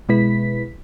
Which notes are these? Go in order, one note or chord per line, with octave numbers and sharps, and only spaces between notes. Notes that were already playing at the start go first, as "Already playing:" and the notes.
B2 G#3 E4 B4 B6